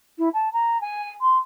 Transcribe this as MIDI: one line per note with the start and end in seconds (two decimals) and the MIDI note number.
0.18 0.29 64
0.34 0.51 81
0.53 0.80 82
0.81 1.10 80
1.21 1.37 84